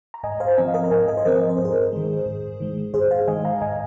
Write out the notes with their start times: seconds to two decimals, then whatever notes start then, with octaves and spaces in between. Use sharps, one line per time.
0.14 A#5
0.23 G#2 D#5 G#5
0.40 C5 F5
0.57 F3 C4 D#5 G#5
0.68 F5
0.74 A#4 D#5
0.84 A#5
0.91 G#2 D#5 G#5
1.08 A#4 D#5
1.17 C5
1.25 F3 C4 A#4 D#5
1.42 D#5
1.49 C5
1.57 G#2 A#4
1.64 G#4 C5
1.93 D#3 G#3
2.26 G#2
2.60 D#3 G#3
2.94 G#2 G#4 C5
3.11 C5 F5
3.28 D#3 G#3 D#5 G#5
3.45 F5 A#5
3.61 G#2 D#5 G#5